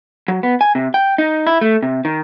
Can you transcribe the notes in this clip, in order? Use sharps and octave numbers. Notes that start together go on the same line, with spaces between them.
F#3
B3
G#5
C3
G5
D#4
E4
A3
C3
D#3